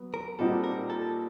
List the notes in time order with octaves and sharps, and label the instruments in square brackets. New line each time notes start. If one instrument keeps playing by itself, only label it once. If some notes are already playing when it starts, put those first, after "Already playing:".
Already playing: [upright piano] F#3 B3
[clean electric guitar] A#4
[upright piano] A#2 G3 C4 D#4 F#4 [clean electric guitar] A4
[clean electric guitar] A#4
A4